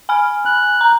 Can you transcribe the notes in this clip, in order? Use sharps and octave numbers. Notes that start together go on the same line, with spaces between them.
G#5 B5 F6
F#6
A#5